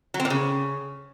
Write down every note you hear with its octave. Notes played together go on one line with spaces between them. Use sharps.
F#3
C4
A#2
C#3